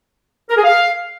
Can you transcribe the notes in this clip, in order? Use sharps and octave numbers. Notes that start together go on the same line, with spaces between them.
A#4
G#4
F5